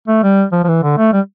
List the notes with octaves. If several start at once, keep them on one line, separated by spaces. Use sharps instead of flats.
A3
G3
F3
F3
E3
D3
A3
G3